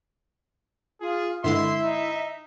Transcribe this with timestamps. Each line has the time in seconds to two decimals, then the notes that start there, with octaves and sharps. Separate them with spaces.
1.01 F4 G#4
1.44 G2 D3 G#3 E4 E5 C6
1.83 D#4